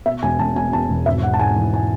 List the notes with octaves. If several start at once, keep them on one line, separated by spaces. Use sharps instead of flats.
B2 E5
E1 G#5
E1 A5
B2 G#5
E2 A5
E1
G#1 E5
G#1 F#5
A5
G#2 G#5
E3
G#5